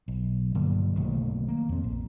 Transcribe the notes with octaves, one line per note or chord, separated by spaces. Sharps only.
B1
G2 D3 F#3 A#3
B1 D#3 A3 A#3
A#3
F2 C4
A#1